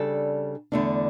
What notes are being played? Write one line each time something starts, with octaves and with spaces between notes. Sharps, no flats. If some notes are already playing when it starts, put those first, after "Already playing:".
Already playing: C#3 G3 D4 A4
E2 D3 A3 D4